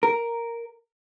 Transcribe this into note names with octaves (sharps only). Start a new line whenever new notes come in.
A#4